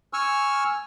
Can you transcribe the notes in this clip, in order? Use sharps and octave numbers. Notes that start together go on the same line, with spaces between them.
G#5 C#6 E6 F6